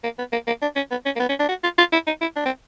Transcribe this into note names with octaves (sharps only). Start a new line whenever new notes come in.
A#3
B3
A#3
A#3
D4
C#4
B3
C#4
A#3
B3
C#4
D4
F#4
F4
F4
E4
D#4
E4
D4
C4